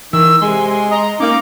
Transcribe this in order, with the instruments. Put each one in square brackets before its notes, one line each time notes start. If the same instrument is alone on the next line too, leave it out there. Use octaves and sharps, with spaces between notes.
[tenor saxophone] D#3 [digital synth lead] E3 [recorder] E6
[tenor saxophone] C3 [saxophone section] G#3 [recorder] G#5 [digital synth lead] C6
[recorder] G#5
[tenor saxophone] D#5 [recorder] A#5
[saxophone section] A#3 [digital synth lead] C#4 [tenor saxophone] D#4 [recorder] D6